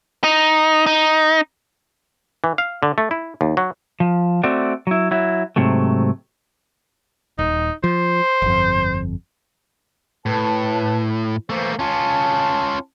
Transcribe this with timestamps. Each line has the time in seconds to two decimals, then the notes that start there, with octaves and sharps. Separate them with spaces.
0.24 D#4
0.86 D#4
2.44 E3
2.58 F5
2.83 D3
2.98 A3
3.11 E4
3.41 D#2
3.57 F#3
4.00 F3
4.43 A3 C4 F#4 D5
4.87 F#3 E4
5.11 F#3 E4
5.56 G#2 C3 F#3 A3
7.39 D#1 D#4
7.84 F3 C5
8.42 G1 F2
10.26 A2 B4 A5
11.50 E3 A3 A#3 C5
11.79 C#4 F4 A5